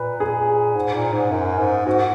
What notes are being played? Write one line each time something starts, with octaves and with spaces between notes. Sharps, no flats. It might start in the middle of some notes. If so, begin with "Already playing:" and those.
Already playing: A#2 B4
G#4
G#2
A#2
G#2
F#2
G#2
G#2 F#4